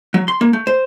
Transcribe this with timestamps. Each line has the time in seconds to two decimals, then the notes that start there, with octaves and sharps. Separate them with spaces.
0.14 F#3
0.28 C6
0.41 A#3
0.53 A3
0.67 C5